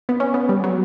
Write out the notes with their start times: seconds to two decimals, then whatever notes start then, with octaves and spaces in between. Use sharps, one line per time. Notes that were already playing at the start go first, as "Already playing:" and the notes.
0.09 B3
0.20 C#4
0.34 B3
0.49 G3
0.64 F#3